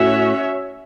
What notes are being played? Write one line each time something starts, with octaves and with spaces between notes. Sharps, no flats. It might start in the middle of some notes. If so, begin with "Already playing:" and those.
Already playing: A2 C#4 F#4 C#5 E5